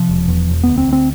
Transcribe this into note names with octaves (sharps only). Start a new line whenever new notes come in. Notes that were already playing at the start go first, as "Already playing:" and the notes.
Already playing: C3 F3
E1
E2
E1
D2 B3
C4
D2 C4